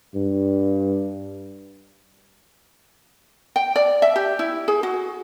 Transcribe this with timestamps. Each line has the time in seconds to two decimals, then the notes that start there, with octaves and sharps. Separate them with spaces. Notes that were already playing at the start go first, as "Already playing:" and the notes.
0.15 G2
3.56 G5
3.76 D5
4.02 E5
4.16 G4
4.39 E4
4.68 G#4
4.83 F#4